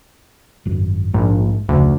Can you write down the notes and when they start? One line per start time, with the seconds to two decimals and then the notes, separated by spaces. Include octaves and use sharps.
0.65 G#1 F#2
1.14 A#1 G#2
1.69 F1 D2 C#3